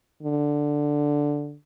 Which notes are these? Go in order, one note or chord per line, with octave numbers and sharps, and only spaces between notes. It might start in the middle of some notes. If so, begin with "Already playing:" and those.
D3